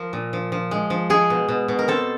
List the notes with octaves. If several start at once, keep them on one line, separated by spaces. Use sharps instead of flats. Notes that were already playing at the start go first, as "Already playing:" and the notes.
Already playing: F3 A#4
A#2
F3
F3
G#3
F3
G#3 G#4
B2
B2
B2
A#4
C4 A4